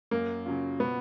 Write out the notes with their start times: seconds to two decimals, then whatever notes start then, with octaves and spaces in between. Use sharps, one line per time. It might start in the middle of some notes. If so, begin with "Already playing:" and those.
0.11 F#2 A#3
0.46 C#3 F#3 C#4 F4
0.80 B2 B3